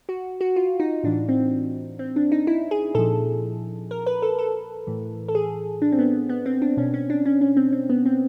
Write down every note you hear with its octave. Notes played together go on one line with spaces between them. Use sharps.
F#4
F#4
F4
D#4
A2 E3 D4
C4
C4
D4
D#4
E4
G#4
A#2 F3 A4
A#4
B4
A4
A4
A2 E3
A4
G#4
D4
C4
B3
B3
C4
D4
B2 C#4
C#4
D4
C#4
C#4
C4
C4
B3
C4